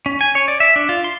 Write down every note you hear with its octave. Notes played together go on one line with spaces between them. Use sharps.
C#4
G#5
C#5
D5
E5
D4
F4
C6